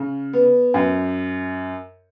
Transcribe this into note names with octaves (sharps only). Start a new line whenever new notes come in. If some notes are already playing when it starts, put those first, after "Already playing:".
Already playing: C#3
B3
F#2